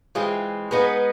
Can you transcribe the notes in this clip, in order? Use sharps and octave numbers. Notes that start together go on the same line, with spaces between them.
E3 G#3 C4 F4
G#3 B3 D#4